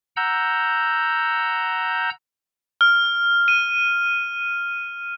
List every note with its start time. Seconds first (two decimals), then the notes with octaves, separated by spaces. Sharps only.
0.17 F#5 A#5 E6 G6
2.81 F6
3.48 D#7